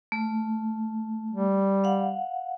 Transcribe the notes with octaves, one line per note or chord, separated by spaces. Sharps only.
A3
G3
F5 F#5